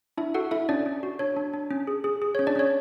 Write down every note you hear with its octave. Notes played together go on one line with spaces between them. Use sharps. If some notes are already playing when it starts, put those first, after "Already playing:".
D4 E4 E5
F#4 A4 F#5
E4 A4 E5
C#4 D4 D5
C#4
F#4
D4 C#5
D4
D4
C#4
G#4
G#4
G#4
C#5
C#4
D4 D5
C#4 C#5